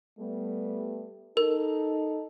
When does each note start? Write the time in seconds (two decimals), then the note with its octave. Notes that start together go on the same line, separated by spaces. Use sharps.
0.19 G3 A3 B3
1.37 D#4 A4 A#4